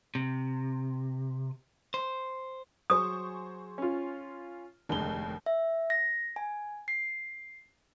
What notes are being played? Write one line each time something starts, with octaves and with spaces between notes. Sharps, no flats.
C3
C5
F#3 G#4 C5 C#6 D#6
C#4 F4
F1 D#2 D3 G#3 G7
E5
A#6
G#5
C7